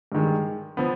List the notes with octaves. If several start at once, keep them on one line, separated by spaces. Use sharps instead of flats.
G2 D#3 G#3
F3 B3